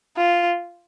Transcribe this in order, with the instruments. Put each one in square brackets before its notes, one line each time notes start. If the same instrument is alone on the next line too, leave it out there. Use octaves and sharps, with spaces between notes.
[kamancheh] F4